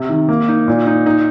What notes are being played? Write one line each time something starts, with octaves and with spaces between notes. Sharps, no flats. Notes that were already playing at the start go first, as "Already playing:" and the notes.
Already playing: C3
D#3
A#3
D#4
A#2
D#4
D#4